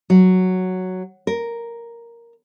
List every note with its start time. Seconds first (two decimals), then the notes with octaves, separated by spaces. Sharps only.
0.10 F#3
1.27 A#4